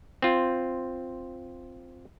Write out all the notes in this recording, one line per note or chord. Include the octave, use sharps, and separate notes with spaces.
C4 F4